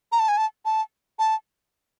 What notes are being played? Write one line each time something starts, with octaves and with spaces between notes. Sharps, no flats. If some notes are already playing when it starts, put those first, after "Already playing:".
A#5
A5
G#5
A5
A5
A5